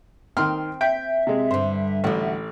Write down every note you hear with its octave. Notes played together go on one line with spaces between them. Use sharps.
D#3 C4 C6 F6
E5 G5
C3 G#3
G2 D3 C5
A1 A2 D3 F#4